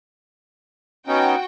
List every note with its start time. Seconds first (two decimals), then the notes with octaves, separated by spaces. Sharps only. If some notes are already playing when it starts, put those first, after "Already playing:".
1.07 B3 C#4 D#4 F#4 G5